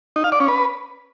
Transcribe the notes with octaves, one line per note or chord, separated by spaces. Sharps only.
D#4
F5
D5
C#4
B4